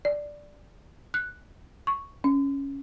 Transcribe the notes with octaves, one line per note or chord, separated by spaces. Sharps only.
D5
F#6
C#6
C#4